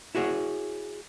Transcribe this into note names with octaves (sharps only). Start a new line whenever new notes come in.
E4 F#4 G#4 C#5